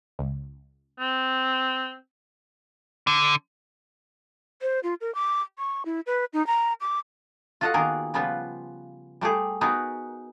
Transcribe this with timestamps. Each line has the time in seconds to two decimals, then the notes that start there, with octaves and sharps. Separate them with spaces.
0.19 C#2
1.00 C4
3.07 D3
4.62 C5
4.83 F4
5.01 A#4
5.15 D6
5.58 C#6
5.85 E4
6.07 B4
6.33 D#4
6.47 A#5
6.81 D6
7.61 F4 F#4 A4 D#5 F5 F#5
7.74 D#3 A#3 B3 G#4 A#4
8.14 C#3 F3 G3 B3 F4 B4
9.21 G3 A3 G4 G#4
9.61 B3 D#4 F#4 G#4 A#4 B4